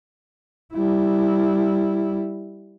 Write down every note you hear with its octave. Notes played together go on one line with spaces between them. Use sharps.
G3 E4